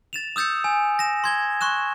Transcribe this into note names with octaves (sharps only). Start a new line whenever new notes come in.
A6 E7 F7
D#6 E6 G6 A6 C#7
G#5
A#6 E7
C6 G#6 G7
C6 C#6 F#6 E7